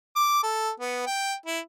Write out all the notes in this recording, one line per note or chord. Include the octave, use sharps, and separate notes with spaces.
D6
A4
B3
G5
E4